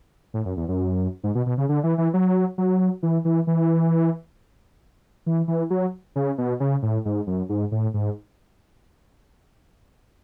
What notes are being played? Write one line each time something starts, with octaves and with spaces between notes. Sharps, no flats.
A2
F#2
E2
F#2
G#2
B2
B2
C#3
D3
E3
E3
F#3
F#3
E3
E3
E3
E3
E3
F#3
C#3
B2
C#3
A2
G#2
F#2
G#2
A2
G#2